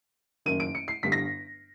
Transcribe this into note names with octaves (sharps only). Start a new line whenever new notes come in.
F#1 F#2 D#3 D#7
D7
C#7
C7
G1 G2 D3 G3 B6
A#6